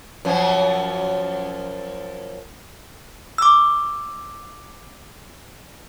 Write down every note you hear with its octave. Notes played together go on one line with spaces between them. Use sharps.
F#2 F3
D6 E6